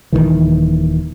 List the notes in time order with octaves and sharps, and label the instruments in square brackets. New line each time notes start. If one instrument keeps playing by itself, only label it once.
[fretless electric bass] D#1 C#2 D#3 E3